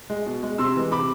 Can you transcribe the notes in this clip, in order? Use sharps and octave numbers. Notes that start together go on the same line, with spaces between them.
G#3
B2
G#3
C3 C6 E6
E3 G#3
C3 B5 D6